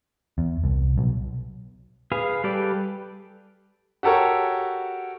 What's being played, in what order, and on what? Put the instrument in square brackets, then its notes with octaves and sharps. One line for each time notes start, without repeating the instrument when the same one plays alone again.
[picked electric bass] E2
C2
B1
[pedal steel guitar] G#4 B4 F5
G3 G4 A4 B4 D5
[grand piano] F#4 G4 A4 A#4 C#5